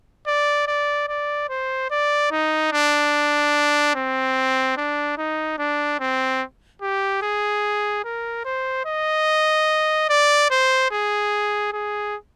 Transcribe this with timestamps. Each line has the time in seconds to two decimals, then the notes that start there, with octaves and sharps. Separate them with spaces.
0.27 D5
0.67 D5
1.08 D5
1.50 C5
1.90 D5
2.31 D#4
2.72 D4
3.95 C4
4.77 D4
5.18 D#4
5.58 D4
6.00 C4
6.81 G4
7.22 G#4
8.04 A#4
8.45 C5
8.85 D#5
10.09 D5
10.50 C5
10.91 G#4
11.73 G#4